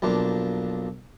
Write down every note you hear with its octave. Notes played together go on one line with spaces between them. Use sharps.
B1 F3 A#3 D4